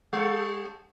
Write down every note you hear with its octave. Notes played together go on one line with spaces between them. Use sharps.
G3 A4